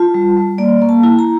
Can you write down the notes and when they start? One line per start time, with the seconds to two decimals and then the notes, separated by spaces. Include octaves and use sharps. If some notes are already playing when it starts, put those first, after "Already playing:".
Already playing: F4 A5
0.14 G3
0.37 G3
0.58 A#3 D5
0.82 A#3
0.89 A5
1.03 E4
1.19 A#5